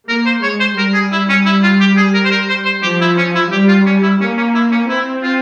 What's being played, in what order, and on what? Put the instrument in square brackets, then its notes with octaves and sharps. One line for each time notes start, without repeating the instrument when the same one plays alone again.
[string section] A#3 [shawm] A#4
[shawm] C5
[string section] G#3 [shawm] C#5
[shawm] C5
[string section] G3 [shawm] A#4
[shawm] G#4
E4
C#4
E4
F4
G4
G#4
A#4
C5
A#4
C5
C5
[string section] F3 [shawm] G4
[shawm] E4
C#4
E4
[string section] G3 [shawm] G4
[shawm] F4
C#4
E4
[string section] A#3 [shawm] C#4
[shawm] C#4
E4
C#4
[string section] C4 [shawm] E4
[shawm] F4